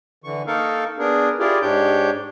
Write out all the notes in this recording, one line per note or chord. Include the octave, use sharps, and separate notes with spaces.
D3 E3 C#6
A#3 D#4 A4 A#4 F5 C#6
B3 D4 G#4 A#4
E4 F4 G4 G#4 A#4 D5
G#2 D4 G4 C#5 G6